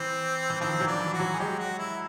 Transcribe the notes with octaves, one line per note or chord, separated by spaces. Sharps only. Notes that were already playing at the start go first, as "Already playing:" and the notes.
Already playing: E3 C4
E3
D#3 F3 C4
E3 F#3
D4
E3
F#4
E3 F#3
G#4
F#3 G#3 G4
F#4
E4